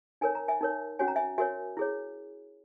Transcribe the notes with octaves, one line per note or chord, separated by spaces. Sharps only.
D#4 A#4 C#5 G#5
A#5
E5 G#5
D#4 A#4 C#5
C#4 F#4 C#5 G#5
A#5
E5 G#5
F#4 A#4 C#5 E5 G#5
E4 G#4 C#5